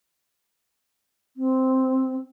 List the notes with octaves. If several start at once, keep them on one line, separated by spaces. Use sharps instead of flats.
C4